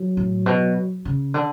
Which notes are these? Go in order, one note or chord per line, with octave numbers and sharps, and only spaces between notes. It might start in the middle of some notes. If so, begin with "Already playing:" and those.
Already playing: F#3
A2
B2
C#3
D3